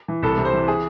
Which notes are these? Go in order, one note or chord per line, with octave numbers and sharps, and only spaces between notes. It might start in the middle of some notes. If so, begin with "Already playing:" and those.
E3
C2 A4
C3
C5
E3
G#4